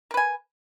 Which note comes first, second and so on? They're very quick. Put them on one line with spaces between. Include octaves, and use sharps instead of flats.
A#4 B4 G#5